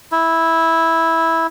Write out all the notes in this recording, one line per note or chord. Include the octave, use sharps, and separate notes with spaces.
E4